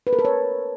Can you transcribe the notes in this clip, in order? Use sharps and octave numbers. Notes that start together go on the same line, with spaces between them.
B4
A#4
A4
C#5